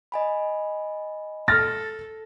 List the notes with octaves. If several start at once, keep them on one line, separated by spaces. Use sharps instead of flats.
D#5 G#5 B5
A4 F6 A6 A#6